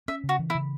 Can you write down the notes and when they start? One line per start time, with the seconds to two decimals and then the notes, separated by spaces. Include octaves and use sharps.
0.08 C#4 E5
0.24 C#3
0.29 F#4
0.39 E3
0.50 E4
0.55 C#3